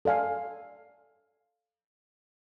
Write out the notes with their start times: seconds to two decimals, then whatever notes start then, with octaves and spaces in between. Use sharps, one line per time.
0.05 A4 D5 F5 G#5